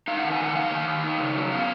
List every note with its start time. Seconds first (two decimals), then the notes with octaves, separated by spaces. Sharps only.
0.08 D#4 F5
0.19 F#5
0.24 D#3
0.32 G#5
0.40 D#3 F#5
0.56 D#4 F5
0.72 D#3
0.87 D#3
1.04 D#4
1.20 C#3
1.36 F#3
1.52 B3 F5